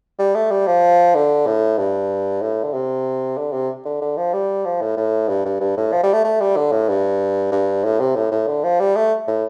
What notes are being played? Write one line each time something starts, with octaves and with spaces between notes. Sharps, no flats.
G3
A3
G3
F3
D3
A2
G2
A2
D3
C3
D3
C3
D3
D3
F3
G3
F3
A2
A2
G2
G2
G2
A2
F3
G3
A3
A3
G3
D3
A2
G2
G2
A2
C3
A2
A2
D3
F3
G3
A3
A2